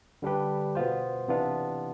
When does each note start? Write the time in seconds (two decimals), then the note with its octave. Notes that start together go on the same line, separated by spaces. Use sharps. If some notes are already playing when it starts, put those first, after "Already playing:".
0.22 D3 G3 D4 G4 B4
0.75 B2 B3 F4 C5
1.28 C3 E3 B3 D4 F4